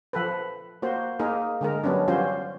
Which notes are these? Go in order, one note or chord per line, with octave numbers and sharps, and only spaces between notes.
F3 A4 B4
A#3 F#4 C5
A#3 D#4 G#4 A#4
D3 G#3 A#4
F#3 G3 B3 C#4 D4
F3 G3 C#4 F4 F#4 C5